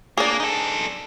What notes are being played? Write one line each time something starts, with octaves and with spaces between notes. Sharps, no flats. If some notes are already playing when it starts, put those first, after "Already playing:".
A#3 D4 G#4
D#4 A4